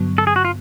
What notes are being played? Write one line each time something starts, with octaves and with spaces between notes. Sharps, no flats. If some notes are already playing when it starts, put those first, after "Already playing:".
Already playing: G2 D3 F#3 B3
A4
G#4
F#4
F4